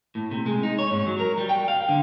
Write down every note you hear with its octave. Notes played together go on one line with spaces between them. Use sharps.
A2
C3
G#3
D#4
C#5
G#2
F#3
A#4
G3
G5
F5
D3